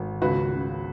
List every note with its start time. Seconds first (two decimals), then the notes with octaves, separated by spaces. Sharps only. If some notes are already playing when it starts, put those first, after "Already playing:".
Already playing: G#1
0.22 C#2 F#4 B4
0.53 C#3